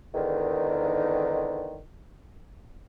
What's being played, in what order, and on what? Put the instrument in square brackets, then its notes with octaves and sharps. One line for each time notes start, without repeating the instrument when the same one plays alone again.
[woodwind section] E2 G#2 D3 D#3